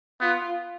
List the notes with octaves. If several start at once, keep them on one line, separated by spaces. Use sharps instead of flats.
B3 F4